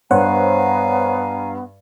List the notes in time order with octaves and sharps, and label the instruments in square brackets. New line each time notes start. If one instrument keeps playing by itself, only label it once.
[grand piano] G2 [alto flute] B3 [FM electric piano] C5 C#5 F#5 [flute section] F5 G#5 A#5